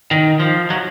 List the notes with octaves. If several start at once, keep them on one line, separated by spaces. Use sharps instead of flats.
D#3
F3
F#3